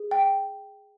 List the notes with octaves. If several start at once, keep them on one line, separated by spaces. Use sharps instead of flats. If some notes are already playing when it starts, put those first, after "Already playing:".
Already playing: G#4
G5